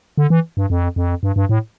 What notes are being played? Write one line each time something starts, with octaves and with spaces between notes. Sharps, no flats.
D3
E3
G2
F2
F2
G2
G2
A2